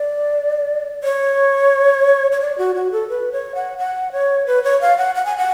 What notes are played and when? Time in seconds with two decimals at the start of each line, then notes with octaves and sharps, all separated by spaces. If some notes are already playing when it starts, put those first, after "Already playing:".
Already playing: D5
1.04 C#5
2.32 C#5
2.41 D5
2.58 F#4
2.75 F#4
2.92 A4
3.09 B4
3.32 C#5
3.55 F#5
3.78 F#5
4.12 C#5
4.47 B4
4.64 C#5
4.81 F5
4.98 F#5
5.15 F#5
5.26 G#5
5.37 F#5